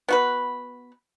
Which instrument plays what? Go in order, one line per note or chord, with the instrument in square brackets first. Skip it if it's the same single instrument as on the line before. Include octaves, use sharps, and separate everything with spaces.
[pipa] B3 F#4 B4